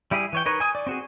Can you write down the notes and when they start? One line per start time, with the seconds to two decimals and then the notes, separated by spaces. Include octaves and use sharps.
0.11 G3 E4 G4 G#4
0.33 E3 C#5 G5
0.46 D#4 A#4 B4 C#5
0.60 G#5 D#6
0.75 D5
0.87 C4 F#4 G#4